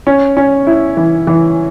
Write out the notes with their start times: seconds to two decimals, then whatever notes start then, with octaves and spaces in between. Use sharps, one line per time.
0.07 C#4
0.37 C#4
0.67 E4
0.97 E3
1.27 E3